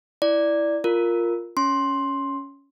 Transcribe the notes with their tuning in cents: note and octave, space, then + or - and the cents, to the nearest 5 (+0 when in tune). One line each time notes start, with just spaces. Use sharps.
E4 +0 D5 +0
F4 +0 A#4 +0
C#4 +10 C6 +10